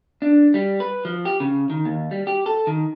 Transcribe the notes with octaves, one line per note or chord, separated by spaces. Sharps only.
D4
G3
B4
F3
G4
C#3
D#3
D#2
G3
G4
A4
D#3